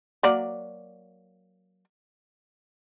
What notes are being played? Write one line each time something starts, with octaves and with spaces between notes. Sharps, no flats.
F#3 A#3 D5